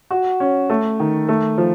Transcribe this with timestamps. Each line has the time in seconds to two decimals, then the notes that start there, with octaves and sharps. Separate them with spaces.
0.11 F#4
0.40 C#4
0.70 A3
1.00 D#3
1.29 A3
1.58 F3